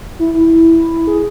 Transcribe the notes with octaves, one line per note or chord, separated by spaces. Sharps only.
E4
E4
G#4